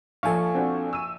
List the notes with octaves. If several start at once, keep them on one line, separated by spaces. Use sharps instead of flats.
A#1 F3 A4 F5 G#5 C#6
C4 D4 F#4
E6 D#7